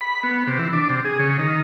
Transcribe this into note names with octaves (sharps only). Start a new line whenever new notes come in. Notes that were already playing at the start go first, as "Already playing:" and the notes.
B5
B3
C3
E3
D4
C3
G#4
C#3
D#3